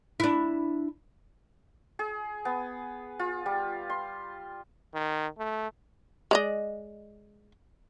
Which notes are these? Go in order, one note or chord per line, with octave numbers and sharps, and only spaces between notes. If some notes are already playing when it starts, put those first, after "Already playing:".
D4 E4
G#4
B3
F4
G3
C6
D#3
A3
G#3 D5 D#5